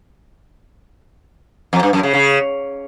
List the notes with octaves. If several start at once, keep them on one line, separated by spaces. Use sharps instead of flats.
F2
G2
F#2
C#3
C#3